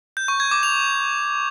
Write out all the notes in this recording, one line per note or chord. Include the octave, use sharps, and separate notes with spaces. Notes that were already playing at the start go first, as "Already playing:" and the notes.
G6
C#6
G#6
D6
F7